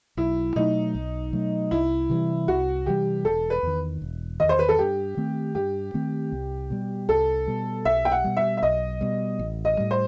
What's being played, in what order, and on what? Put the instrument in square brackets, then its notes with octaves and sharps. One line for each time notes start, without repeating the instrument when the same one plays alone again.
[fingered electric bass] B1 [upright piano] E4
[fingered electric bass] B2 F#3 A3 [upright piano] D#4
[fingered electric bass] B1
B2 F#3 A3
[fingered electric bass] C2 [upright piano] E4
[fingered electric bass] C3 E3 G3
[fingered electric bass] C2 [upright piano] F#4
[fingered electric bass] C3 E3 G3 [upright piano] G4
[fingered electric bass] E1 [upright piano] A4
[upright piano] B4
[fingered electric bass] E2 D#3
E1
[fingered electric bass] E2 D#3 [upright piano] D#5
[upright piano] C5
B4
A4
[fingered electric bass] G2 [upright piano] G4
[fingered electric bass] D#3 A3 C4
[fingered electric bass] G2 [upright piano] G4
[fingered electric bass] D#3 A3 C4
C2
B2 G3
[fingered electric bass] C2 [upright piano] A4
[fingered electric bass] B2 G3
[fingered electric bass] B1 [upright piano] E5
[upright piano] G5
F#5
[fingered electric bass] B2 G3
[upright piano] E5
E5
[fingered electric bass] B1 [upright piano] D#5
[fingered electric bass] B2 G3
A1
[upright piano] D#5
[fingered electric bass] A2 G3
[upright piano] C5